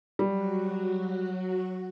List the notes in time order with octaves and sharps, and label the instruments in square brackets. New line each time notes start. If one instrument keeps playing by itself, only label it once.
[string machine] F#3 F#4 [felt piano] G3